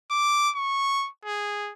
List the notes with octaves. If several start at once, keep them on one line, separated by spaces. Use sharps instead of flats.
D6
C#6
G#4